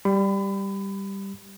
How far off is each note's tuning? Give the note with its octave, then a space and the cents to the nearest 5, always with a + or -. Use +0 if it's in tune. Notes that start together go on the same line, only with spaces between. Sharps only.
G3 +0 B5 +30